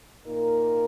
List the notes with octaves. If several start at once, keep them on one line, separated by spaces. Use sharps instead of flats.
A#2 A#3 D#4 A#4